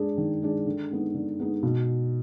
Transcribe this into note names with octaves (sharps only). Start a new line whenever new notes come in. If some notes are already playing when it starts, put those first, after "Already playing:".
Already playing: G#3 D4 G#4
D#3
G#3 D4 G#4
D3
G#3 B3 D#4
D3
G#3 B3 D#4
B2